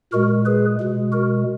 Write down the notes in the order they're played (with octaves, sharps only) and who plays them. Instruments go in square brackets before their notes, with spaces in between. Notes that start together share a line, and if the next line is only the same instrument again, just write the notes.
[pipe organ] A#2 G#3 F#4 A#4
G#4 B4
B2 G#3
F#4 A#4